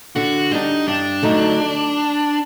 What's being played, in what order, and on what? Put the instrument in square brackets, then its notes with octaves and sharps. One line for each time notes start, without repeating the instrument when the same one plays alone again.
[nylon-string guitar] D3 [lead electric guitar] F#4
[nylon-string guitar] G3 D4 [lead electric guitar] D#4
[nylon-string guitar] G2 [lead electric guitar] D4
[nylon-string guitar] D3 F#3 A3 D#4